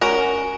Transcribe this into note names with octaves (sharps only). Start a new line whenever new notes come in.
C#4 F#4 A#4